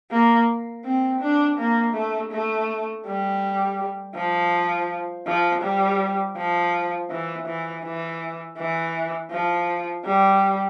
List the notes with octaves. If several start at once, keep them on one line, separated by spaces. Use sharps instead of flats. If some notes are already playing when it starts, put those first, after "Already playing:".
A#3
C4
D4
A#3
A3
A3
G3
F3
F3
G3
F3
E3
E3
E3
E3
F3
G3